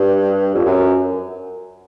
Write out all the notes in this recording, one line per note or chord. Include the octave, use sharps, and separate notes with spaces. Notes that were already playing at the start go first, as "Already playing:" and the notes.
Already playing: G2
F2
F#2